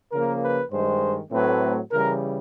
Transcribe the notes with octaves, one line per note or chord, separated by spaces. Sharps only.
C#3 F3 A#3 A#4
B4
G2 D#3 G#3 C5
A2 F#3 A3 C4 B4
C#3 E3 G3 A#4